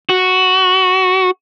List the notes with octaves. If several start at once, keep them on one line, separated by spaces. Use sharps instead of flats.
F#4